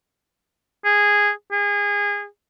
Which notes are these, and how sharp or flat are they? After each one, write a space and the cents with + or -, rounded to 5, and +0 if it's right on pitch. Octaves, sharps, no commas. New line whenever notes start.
G#4 -10
G#4 -25